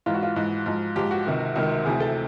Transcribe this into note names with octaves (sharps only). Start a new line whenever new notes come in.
G#2 E3 F4
F#4
F4
G#2 E3
G#2 F3
G#2 F3 G4
F#4
C#2 C3 D#3
C#2 C3 D#3
D2 C3 E3 G#4
A4